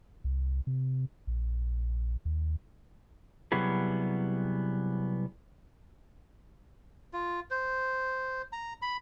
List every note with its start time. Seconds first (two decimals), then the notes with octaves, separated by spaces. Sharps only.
0.24 C2
0.67 C3
1.27 A#1
2.25 D#2
3.52 C3 F#3 G3 B3 E4 G#4
7.13 F4
7.51 C5
8.52 A#5
8.82 B5